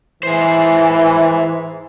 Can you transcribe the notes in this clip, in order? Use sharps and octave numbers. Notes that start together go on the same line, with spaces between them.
E3 G#4 C5